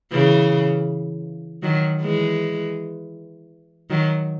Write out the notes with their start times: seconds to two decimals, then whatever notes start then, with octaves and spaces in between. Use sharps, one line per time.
0.12 C#3 E3
1.63 D#3 F#3
2.01 E3 G#3
3.90 D#3 F#3